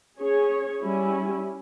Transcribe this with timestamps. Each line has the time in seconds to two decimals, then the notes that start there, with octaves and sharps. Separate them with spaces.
0.19 C#4 G#4 C#5
0.82 G3 C#4 E4